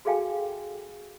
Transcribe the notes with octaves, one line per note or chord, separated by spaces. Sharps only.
F#4 G#4 A4 F5 G5 G#5